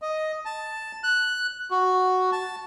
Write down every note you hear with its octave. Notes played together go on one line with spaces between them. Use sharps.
D#5
A5
F#6
F#4
A5